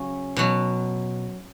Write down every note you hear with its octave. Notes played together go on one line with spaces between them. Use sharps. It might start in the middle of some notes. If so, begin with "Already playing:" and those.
Already playing: C#3 F#3 C#4
B2 F#3